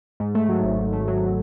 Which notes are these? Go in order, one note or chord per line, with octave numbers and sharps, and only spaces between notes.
G#2
A3
F#3
G#1
G#2
A3
F#3